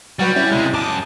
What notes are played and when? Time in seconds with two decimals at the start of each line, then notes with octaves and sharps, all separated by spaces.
0.19 F#3 G3 F#4 B4
0.36 C#4 E4
0.52 C3 G#3
0.74 F#2 A5 D6 D#6